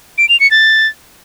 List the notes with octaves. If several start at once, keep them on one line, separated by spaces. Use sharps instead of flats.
D7
F7
C#7
A6